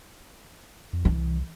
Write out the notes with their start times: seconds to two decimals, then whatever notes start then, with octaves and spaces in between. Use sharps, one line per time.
0.93 F2
1.05 C2 E3